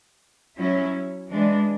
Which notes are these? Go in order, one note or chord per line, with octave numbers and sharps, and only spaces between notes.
F#3 C#4 E4
E3 G#3 D4